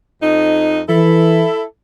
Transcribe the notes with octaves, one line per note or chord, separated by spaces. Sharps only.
F2 D#4
E3 E4 A4